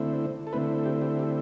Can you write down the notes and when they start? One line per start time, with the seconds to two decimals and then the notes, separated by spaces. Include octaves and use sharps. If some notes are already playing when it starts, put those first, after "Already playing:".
Already playing: D3 A3 C4 E4
0.47 A4
0.53 D3 A3 C4 E4 B4
0.86 G4
1.01 G4
1.19 G4